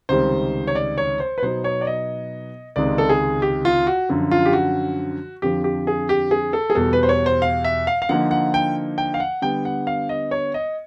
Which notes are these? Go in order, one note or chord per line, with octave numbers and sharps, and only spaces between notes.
C#2 C3 D#3 G3 C4 C5
C#5
D5
C#5
C5
B4
B2 F#3 B3 D#4 C5
C#5
D5
D#5
C#2 C3 D#3 G#3 D5
A4
G#4
G4
F4
F#4
F#2 D3 F3
F4
G4
F#4
F2 D3 F3 G4
G4
G#4
G4
G#4
A4
G#4
E2 B2 G3 A4
B4
C5
C#5
C5
F5
E5
F5
F5
D3 F3 A#3 D#4 F#5
F#5
G5
G5
F5
F#5
D3 G3 B3 G5
F#5
F5
D#5
C#5
D#5